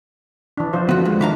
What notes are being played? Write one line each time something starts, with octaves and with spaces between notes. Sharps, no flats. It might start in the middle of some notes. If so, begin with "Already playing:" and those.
E3 D4
F3 F4 C5
D3 B3 F4 F#4
E2 G#3
D#3 D4 E5 F5 A#5